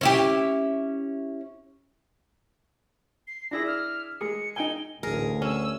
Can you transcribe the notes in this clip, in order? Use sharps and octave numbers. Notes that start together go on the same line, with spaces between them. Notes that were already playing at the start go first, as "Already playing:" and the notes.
C#4 E4 G4
C7
D4 E4 G#4 A#6
F6
G#3 G#4 C#7
D#4 G5 G#5 G7
A1 D2 G#4 A#4
C#4 G#5 E6